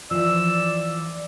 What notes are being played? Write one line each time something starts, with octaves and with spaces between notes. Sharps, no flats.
E3 F3 D5 E6